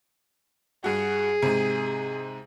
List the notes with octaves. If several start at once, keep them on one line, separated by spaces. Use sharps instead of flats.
G2 F#4 G#4
G#2 C3